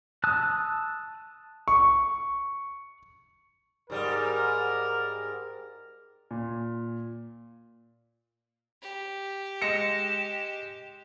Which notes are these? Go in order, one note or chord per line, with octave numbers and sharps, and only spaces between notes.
A5 D#6 E6 F#6
C#6
G#2 G3 A#4
A#2
G4
G#3 A#6 C#7 E7